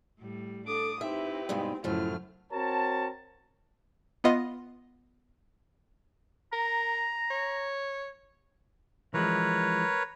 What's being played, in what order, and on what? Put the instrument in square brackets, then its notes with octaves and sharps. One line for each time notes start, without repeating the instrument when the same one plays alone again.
[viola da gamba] A2 G3
[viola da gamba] D4 [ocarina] A4 [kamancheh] D6 D#6
[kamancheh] C4 [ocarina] D#4 [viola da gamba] E4 G4 B4 [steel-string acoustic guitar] E5
[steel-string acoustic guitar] G2 B2 G#3 [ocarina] D#4
[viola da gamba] F#2 C#3 F#3 [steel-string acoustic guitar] A2 F3 [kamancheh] A3 F6 [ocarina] E4
[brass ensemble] C4 F#4 A#4 C#5 A5
[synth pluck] B3 F4 D#5
[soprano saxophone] A#4 [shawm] A#5
[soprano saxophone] C#5
[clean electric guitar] E3 F3 G#3 [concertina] A#4 B4 C#5